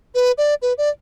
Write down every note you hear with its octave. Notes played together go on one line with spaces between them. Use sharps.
B4
D5
B4
D5